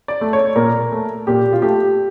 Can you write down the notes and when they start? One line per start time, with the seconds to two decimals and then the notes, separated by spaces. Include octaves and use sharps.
0.08 D5
0.21 A3
0.33 C#5
0.56 A#2 A#4
0.92 A3
1.27 A#2 G4
1.53 F4
1.62 A3 G4